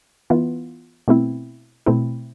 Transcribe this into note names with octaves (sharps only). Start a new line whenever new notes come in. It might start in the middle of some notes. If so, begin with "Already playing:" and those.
E3 B3 F4
B2 A3 C4 E4
B2 A3 C4 E4